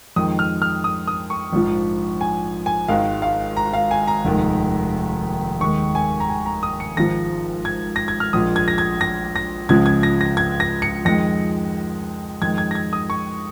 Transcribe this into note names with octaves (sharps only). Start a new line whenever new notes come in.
F2 D#3 G#3 D#6
F6
F6
D#6
D#6
C#6
A#1 G#2 F3
G#5
G#5
G#1 G#2 D#3 G#3 F5
F5
A#5
F5
G#5
A#5
F1 D#2 D#3 G#3
D#2 D#3 G#3 C#6
G#5
A#5
G#5
A#5
D#6
C#7
G#1 G#2 F3 G#3 A#6
G#6
A#6
G#6
F6
A#1 A#2 G#3 D#6
G#6
A#6
G#6
A#6
A#6
C#2 C#3 F3 G#3 G#6
G#6
A#6
A#6
G#6
A#6
C#7
F2 D#3 G#3 A#6
F2 D#3 G#3 G#6
G#6
A#6
G#6
D#6
C#6